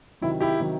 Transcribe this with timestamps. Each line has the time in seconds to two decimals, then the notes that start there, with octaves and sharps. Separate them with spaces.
0.21 C3 D#3 F#3 E4
0.40 E4 G4
0.60 C3 D#3 F#3